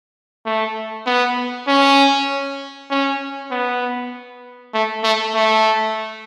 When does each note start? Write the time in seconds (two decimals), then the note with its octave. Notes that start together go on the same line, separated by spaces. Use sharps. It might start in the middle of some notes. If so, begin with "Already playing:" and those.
0.46 A3
1.06 B3
1.68 C#4
2.91 C#4
3.51 B3
4.74 A3
5.04 A3
5.35 A3